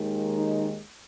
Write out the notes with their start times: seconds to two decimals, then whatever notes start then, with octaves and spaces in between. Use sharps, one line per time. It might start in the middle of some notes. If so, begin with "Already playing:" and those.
Already playing: D#2 D#3 G#3
0.34 D#4